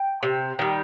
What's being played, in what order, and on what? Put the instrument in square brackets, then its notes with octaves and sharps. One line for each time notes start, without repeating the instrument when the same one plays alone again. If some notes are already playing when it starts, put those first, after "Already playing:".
Already playing: [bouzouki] G5
C3
D#3 G3